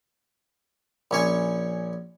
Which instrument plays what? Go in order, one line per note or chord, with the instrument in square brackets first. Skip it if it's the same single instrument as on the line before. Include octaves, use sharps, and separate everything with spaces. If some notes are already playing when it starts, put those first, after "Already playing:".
[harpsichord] A#1 C#4 C#5 G#5